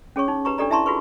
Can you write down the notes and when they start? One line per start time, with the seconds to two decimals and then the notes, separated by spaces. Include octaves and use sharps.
0.16 C#4 G#4 C#5 C#6
0.28 D#4
0.45 G4 B4 A#5 C#6
0.58 D4 G4 A4 D5 A#5
0.70 E4 E5 A5 A#5 C6 C#6
0.86 F4 F#4 G#4 B4 C#6